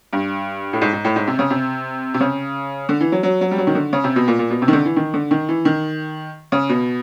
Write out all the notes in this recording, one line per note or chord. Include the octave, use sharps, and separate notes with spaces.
G2
A2
G#2
G#2
A2
G#2
C3
C#3
C3
C3
C#3
D3
E3
F#3
F#3
F#3
G3
F#3
D#3
D3
C#3
C3
B2
A#2
A#2
B2
C3
D#3
D3
E3
D#3
D3
D#3
E3
D#3
C#3
B2